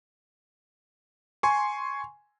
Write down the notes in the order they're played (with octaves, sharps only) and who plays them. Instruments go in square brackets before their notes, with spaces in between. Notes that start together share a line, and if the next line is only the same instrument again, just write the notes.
[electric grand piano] G#5 C6 C#6